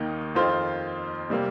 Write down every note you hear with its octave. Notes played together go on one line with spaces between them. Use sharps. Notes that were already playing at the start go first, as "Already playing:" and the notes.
Already playing: D#2 D#3 A#3 D#4
F2 D#3 C4 F4 C5
C3 G3 A#3